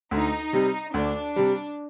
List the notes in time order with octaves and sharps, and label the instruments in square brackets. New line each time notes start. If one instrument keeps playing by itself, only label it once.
[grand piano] D2 [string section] D#4
[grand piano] C3 G3
[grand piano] D2 [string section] D4
[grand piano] C3 G3